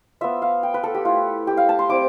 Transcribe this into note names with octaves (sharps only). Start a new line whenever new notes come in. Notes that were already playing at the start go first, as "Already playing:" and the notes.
B3 F4 E5
F5
G5
B4
A4
G4
A3 E4 F4
G4
F5
A5
C6
G3 C4 E4 D6